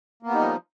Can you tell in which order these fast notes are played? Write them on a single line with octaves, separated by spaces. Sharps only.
A#3 B3 G3 D#4 F3